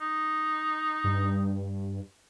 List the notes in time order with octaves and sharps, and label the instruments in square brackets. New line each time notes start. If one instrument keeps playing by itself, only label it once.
[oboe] D#4
[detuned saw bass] G2